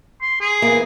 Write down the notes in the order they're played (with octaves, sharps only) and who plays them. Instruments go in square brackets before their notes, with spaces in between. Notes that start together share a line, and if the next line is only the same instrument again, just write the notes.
[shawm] C6
G#4
[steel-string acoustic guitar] E3 A#3